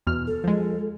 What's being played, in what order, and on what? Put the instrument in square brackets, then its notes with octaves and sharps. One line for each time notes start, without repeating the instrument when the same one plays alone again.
[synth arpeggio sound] E2 B2 F6
[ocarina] A4
[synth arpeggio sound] F3 G#3